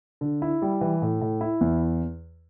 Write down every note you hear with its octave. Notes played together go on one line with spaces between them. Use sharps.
D3
E4
G3
E3
A2
A2
E4
E2